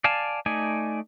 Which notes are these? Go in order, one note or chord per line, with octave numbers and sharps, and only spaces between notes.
D5 F5 G#5 A5
A3 D#4 D5 G#5